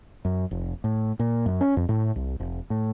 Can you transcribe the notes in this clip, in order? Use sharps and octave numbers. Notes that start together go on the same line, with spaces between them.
F#2
F1
A2
A#2
F#2
C#4
F2
A2
C2
F1
A2